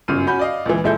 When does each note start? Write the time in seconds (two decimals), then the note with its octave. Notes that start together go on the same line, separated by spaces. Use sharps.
0.08 G1 F#2 C#3 F6 D#7
0.27 C#4 F#4 B5 G6
0.39 D5 D#5 F5
0.66 C#2 A#2 E3
0.84 A#1 G#3 E4 A4 G6